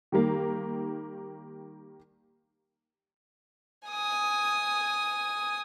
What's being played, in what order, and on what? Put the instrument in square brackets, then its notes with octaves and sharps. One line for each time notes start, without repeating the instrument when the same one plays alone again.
[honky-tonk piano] D#3 G3 A#3
[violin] G#5 D#6